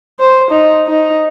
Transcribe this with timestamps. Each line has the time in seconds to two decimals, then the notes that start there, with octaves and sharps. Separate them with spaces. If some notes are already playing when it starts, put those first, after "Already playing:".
0.20 C5
0.51 D#4
0.87 D#4